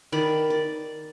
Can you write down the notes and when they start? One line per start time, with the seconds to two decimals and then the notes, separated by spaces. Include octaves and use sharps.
0.12 D#3 D5 B5
0.50 D5